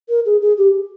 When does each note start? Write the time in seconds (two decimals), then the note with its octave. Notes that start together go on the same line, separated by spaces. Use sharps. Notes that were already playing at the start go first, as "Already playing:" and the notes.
0.09 A#4
0.25 G#4
0.41 G#4
0.57 G4